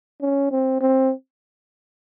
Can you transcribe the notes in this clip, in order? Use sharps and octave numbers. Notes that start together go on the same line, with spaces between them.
C#4
C4
C4